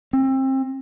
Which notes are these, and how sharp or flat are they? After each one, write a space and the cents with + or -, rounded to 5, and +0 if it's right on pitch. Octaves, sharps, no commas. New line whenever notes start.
C4 +30